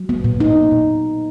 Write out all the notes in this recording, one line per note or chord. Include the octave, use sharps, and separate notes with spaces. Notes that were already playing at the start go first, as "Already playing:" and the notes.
Already playing: F#3
B3
A#2
D#4
A#2